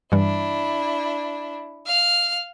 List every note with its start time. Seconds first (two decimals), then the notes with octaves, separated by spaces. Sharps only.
0.12 G2 E3 G3 D4 E4
1.85 F5 F6